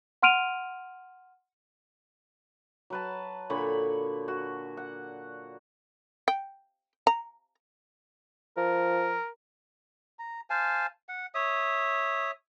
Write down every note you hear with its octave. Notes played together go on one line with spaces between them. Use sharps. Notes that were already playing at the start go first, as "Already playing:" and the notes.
F#5 C6 F6 D7 D#7 F7
F#3 B4 A5
A#2 D3 C#5 B5
F#4
F#5
G5
A#5
F3 A#4
A#5
C5 F5 G#5 A5
F#5
C#5 E5 D#6